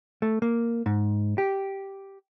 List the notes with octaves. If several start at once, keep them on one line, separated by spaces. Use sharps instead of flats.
A3
A#3
G#2
G4